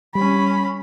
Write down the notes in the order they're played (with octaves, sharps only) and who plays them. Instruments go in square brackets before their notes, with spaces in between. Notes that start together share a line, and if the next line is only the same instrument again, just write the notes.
[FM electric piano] G3 [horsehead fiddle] C#4 B5